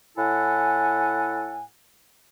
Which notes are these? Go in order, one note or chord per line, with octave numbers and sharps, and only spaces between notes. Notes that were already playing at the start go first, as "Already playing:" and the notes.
A2 E4 A4 F#5 G#5